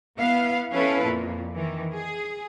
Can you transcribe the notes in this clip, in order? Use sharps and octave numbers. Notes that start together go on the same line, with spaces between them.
B3 E4 F5
F3 C#4 E4 A4 B4 F5
F2 A#2
D#3 E3
G#4